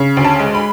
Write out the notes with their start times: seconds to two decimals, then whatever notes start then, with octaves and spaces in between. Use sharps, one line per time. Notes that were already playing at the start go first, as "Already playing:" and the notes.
Already playing: C#3
0.17 D2
0.24 A5
0.39 G#3
0.55 B5